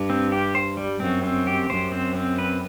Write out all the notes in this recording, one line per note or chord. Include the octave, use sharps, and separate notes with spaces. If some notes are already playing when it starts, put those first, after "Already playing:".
Already playing: G2
C4
G4
C5
G3
F#2 C4
C4
G4
F#2 C5
C4
C4
B4